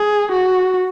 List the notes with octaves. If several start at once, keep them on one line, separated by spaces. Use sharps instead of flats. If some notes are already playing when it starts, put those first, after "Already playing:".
Already playing: G#4
F#4